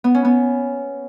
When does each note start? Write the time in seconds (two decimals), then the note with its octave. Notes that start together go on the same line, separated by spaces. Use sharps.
0.04 B3
0.14 C#4
0.25 B3